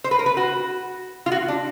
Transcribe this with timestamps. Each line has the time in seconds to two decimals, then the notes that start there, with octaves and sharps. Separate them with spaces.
0.04 C5
0.11 B4
0.19 A#4
0.26 B4
0.37 F#4
1.26 F4
1.32 F#4
1.48 D4